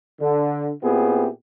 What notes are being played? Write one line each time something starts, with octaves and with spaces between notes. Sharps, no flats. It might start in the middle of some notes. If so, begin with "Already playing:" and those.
D3
A#2 B3 C4 E4 G4 G#4